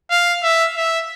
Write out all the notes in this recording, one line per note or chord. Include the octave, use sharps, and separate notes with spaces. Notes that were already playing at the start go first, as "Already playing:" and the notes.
F5
E5
E5